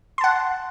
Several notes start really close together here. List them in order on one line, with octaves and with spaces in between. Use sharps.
C6 A5 F#5